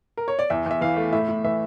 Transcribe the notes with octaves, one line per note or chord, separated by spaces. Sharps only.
A#4
C#5
D5
E2 E5
E2 E5
E3 F5
A3
A2 E5
A2
E3 E5